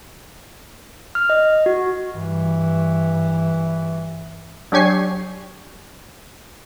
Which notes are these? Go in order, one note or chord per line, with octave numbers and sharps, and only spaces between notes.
F6
D#5
F#4
G2 E3
F#3 D4 G4 G#5 C#6 C7